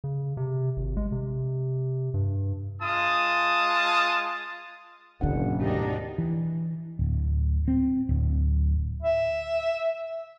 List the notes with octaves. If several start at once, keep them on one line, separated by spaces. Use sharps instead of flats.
C#3
C3
G#1
G#3
C3
G2
G#3 F4 A5 D#6
F#1 G#2 B2 D3 D4 F#5
D2 D4 D#4 G4
E3
D1
C4
D1
E5